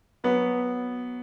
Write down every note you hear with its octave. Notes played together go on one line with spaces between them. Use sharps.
F#3 B3